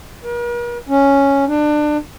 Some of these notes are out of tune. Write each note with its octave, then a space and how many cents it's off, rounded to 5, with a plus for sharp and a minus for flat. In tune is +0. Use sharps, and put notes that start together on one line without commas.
A#4 +45
C#4 +0
D4 +25